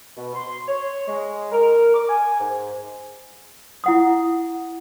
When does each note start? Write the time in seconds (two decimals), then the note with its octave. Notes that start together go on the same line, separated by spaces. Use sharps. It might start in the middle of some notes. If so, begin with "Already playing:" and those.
0.16 B2
0.34 C6
0.68 C#5
1.07 G#3
1.52 A#4
1.94 D6
2.09 G#5
2.39 G#2
3.84 E4 F#5 D#6